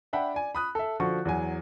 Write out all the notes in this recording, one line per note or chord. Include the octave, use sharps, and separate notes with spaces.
D4 E5 F#5 G5 B5
D5 G#5
B5 D#6 F#6
A4 E5
D3 F3 F#4 C#6
E2 F#3 G#5